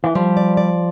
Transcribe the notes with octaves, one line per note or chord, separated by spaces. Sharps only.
E3
F3 G3
D5
D5